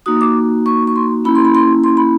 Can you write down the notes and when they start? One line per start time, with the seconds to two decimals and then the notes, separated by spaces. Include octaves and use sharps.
0.06 A#3 D#4 F#4 D#6
0.21 D6
0.66 C#6
0.87 C#6
0.96 C6
1.24 A#3 C#4 E4 B5
1.35 C6
1.45 B5
1.55 C6
1.84 C6
1.97 B5